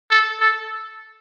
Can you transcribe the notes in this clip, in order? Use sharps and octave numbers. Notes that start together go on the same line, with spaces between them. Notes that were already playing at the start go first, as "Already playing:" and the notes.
A4
A4